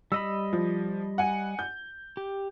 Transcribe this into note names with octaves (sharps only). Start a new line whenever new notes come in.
G3 D#5 B5 E6
F3
F#5 G#5
G6
G4